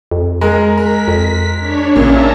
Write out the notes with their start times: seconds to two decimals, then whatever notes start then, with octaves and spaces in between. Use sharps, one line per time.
0.11 F2
0.41 G#3 A#4
0.77 A#4 B6
1.08 F2
1.59 D4 C#5
1.96 A1 A#2 C#3 E5 A5 A#5